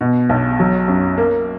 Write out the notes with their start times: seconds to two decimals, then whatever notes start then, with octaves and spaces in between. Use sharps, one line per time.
0.01 B2
0.29 B1
0.59 F#3
0.88 F#2
1.18 A#3